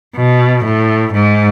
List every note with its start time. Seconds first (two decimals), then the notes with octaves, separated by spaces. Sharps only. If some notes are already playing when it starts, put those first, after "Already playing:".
0.16 B2
0.65 A2
1.13 G#2